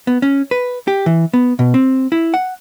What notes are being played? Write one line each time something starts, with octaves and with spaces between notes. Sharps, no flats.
B3
C#4
B4
G4
E3
B3
B2
C4
E4
F#5